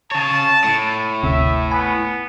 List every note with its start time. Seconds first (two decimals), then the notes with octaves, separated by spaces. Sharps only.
0.11 C#3 C#5 A5
0.64 A2
1.23 G1 D2 C3 E5
1.71 B3 G#5 B5